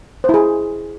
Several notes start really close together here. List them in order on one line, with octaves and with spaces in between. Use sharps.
C5 E4 G#4